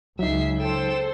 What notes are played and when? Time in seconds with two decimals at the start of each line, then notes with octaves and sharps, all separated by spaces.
0.19 C#2 C#3 F#3 D#4 E5 C7
0.59 A4 C5 G5 E7